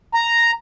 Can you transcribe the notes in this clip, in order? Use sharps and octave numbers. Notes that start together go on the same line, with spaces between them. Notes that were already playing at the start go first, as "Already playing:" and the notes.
A#5